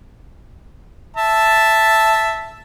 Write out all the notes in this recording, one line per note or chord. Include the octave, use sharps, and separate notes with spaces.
E5 A5